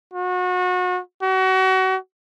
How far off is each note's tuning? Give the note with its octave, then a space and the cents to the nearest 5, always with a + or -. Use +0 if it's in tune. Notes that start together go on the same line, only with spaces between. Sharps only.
F#4 -30
F#4 +30